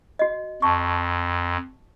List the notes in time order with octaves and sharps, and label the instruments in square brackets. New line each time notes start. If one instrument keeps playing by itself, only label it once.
[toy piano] F#4 D#5
[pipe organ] F2 [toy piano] A5 C#6